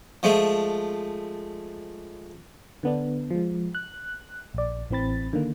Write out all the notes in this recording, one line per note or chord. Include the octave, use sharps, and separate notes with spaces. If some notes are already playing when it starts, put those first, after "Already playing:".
F3 G#3 A3
D3 B3 D4
F3 G#3
F#6
A#1 D5
A1 E3 C4 B5 A6
D3 D#3 A#3